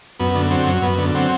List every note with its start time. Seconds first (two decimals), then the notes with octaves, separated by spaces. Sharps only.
0.20 F#2 B3
0.35 D3
0.50 F#3 C4
0.67 F#2
0.82 F#2 B3
0.98 D3
1.15 F#3 C4